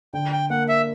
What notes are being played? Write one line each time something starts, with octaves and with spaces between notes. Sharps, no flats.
D3 G5
G5
A#3 F#5
E5